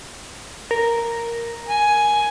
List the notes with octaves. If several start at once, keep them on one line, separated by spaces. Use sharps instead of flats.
A#4
G#5